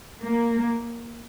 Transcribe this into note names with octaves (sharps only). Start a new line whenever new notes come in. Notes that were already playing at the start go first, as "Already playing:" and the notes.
A#3